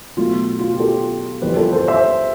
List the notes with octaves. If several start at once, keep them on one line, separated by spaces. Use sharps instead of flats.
B1 B2 A3 F4
F4
G4
F4 A4
G1 F2 E3 G3 G4 B4
F4 A4
A4 C5
C5 E5